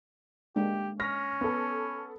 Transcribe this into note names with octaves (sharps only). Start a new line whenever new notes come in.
G#3 A#3 D4 G4
C#4 F6 A#6 B6
B3 A4